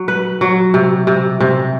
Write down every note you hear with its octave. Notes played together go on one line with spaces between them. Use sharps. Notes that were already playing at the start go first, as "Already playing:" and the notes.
Already playing: F#3
B4
F#3
C3
C3
C3